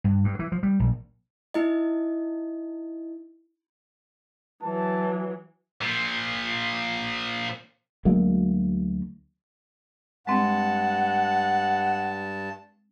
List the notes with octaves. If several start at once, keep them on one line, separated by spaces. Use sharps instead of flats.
G2
G2
E3
F3
G3
A#1
D#4 E4 D#5
E3 F#3 A5
A#2 F3
D2 F#3 G#3 A#3
G2 G#3 C4 F#5 A5